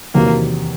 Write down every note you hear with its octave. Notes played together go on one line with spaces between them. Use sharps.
E2 C3 D#3 F#3 A#3